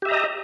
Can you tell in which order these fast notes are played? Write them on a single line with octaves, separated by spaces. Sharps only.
G4 E5 A#5 D#5